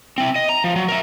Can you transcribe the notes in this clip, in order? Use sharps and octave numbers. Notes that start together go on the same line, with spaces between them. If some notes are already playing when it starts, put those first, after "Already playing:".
C4 E4
D#5
A#5
F3
F#3
A#4 E5